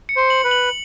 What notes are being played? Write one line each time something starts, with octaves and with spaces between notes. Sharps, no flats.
C#7
C5
F#7
B4
F#7